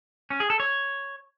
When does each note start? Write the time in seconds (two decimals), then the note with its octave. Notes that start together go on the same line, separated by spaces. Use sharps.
0.30 C#4
0.40 G#4
0.50 A4
0.60 C#5